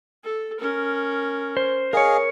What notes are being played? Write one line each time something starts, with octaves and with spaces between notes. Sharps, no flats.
A4
C#4 A#4
C5
G#4 A#4 C#5 D#5 F5